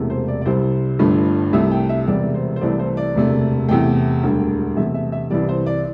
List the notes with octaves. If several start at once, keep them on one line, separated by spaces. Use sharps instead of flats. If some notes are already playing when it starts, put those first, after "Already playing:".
Already playing: E1 E2 C3 A3
C5
D5
D5
C2 C3 G3 C5
G1 G2 D3 A3
C2 C3 A3 E5
G5
E5
E1 E2 C3 E3 G3 D5
C5
C5
C2 C3 E3 A3 D5
C5
D5
E1 D2 C3 A3
E2 C3 A3 G5
E1 D2 D3 G3
E2 C3 E3 A3 E5
E5
E5
C2 C3 E3 G3 D5
C5
D5